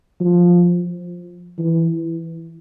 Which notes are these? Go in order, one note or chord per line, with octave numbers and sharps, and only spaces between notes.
F3
E3